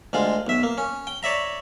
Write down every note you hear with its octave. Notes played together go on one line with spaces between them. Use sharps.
D2 G#3 F4
B1 E5
A#3
C#4
G5
C#5 D5 E5 A#5